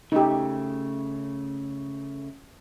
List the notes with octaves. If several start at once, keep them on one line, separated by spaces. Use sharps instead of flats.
C#3 A3 D#4 G4